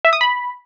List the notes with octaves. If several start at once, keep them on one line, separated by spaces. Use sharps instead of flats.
E5
D#6
B5